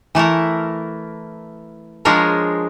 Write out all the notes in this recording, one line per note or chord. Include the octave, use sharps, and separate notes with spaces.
E3 A3 E4 A#4
F3 G#3 D4 G#4 A#4 C#5